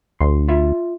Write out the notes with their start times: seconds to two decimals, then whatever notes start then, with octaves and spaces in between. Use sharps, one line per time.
0.21 D2 C6
0.48 F4 E5